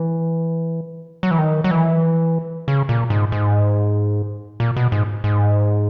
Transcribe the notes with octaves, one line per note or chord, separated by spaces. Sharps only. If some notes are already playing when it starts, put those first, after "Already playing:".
Already playing: E3
F#3
E3
D#3
F#3
E3
C#3
A#2
G#2
G#2
A#2
B2
G#2
G#2